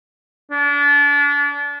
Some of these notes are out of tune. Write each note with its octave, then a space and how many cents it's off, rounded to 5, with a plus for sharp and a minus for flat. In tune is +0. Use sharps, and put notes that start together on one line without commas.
D4 -35